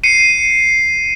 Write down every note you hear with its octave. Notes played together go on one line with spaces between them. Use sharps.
C7 C#7 D#7